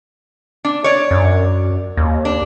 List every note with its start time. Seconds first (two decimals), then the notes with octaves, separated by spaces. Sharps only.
0.65 D4
0.84 C#5 D5
1.11 F#2
1.97 D#2
2.25 D4